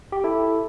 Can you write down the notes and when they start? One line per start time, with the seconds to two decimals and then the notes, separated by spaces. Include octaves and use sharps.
0.12 G4
0.24 E4 A4